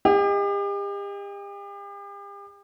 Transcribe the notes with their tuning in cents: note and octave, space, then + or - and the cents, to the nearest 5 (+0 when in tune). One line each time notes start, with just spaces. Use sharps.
G4 +40 D#5 +0